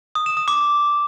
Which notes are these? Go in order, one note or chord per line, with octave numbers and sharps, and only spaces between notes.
D#6
E7
D#6
D6